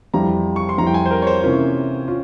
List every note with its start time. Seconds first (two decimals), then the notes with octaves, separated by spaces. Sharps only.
0.14 F2 E3 G3 A#5
0.56 C#6
0.69 C6
0.78 F2 E3 G3 A#5
0.87 G5
0.94 G#5
1.06 C5
1.11 A#4
1.22 C#5
1.27 C5
1.42 C3 E3 A#3 C#4 F4
2.08 C#4 F4